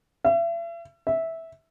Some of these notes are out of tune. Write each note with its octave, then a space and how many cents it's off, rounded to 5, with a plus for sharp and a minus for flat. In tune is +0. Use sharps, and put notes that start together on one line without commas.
E5 +40
E5 -10